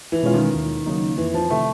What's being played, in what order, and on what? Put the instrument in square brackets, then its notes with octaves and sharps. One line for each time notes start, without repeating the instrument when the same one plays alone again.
[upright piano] E3
[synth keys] B2 G#3 C#4 F4
[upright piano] D#3
[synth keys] D#2
C#3 F#3 A#3 D#4
[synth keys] F2 [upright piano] E3
[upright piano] F3
[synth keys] C3 D#3 [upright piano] A3